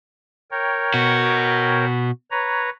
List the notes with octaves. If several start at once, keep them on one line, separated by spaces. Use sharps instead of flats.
A#4 C#5 G5
B2 F#4
B4 C#5 A#5